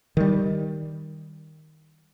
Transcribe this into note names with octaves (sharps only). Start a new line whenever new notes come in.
D#3 G3